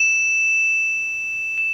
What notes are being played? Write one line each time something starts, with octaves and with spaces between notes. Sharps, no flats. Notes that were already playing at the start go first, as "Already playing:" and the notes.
Already playing: E7
E7